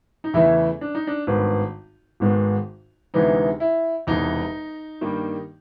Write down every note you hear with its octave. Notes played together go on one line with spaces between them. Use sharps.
D#4
E2 C#3 E3 A3 E4
D4
D#4
D4
G#1 G2 D#3 G#3 B3
G#1 G#2 D#3 G#3 B3
D2 C3 E3 G#3 B3 D#4
E4
E1 E2 C3 D#4
G2 D#3 G3 A#3